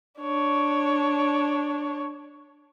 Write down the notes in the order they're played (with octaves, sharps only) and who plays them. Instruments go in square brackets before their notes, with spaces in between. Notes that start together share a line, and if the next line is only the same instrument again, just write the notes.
[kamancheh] D4 C#5